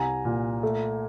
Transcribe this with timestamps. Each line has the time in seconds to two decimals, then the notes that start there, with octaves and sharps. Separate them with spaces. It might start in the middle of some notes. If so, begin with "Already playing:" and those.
Already playing: C2 G#5 A#5
0.25 A#2
0.63 A3